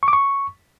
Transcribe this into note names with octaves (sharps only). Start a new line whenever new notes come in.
C#6
D6
C#6